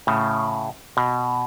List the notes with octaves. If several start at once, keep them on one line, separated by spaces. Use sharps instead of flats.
A2 C#3
B2